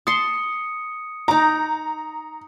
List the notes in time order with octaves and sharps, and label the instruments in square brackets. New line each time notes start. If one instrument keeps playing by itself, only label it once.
[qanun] A5 C6 [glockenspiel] D#6 C#7
[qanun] D#4 D6 [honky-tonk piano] A#5